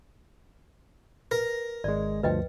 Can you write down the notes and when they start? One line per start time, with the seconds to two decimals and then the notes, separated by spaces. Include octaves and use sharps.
1.31 A#4 B4 A#6
1.84 G#1 G#3 D5
2.23 D2 G2 F3 B4 D#5 G5